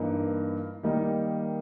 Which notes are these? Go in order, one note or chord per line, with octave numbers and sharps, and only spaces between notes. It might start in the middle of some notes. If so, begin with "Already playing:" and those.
Already playing: G2 E3 A#3 D#4 A#4
D#3 G3 A#3 D#4